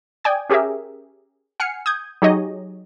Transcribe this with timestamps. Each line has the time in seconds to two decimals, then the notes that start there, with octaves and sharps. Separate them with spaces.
0.24 D5 G5 G#5 D#6 G#6
0.50 C#4 G4 G#4 A#4 E5
1.60 F#5 G#5 F6 C7 C#7
1.86 D#6 G6 G#6
2.22 F#3 D#4 G4 G#4 C#5 D#5